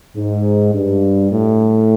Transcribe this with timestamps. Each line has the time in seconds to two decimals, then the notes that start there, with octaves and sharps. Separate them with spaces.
0.16 G#2
0.74 G2
1.31 A2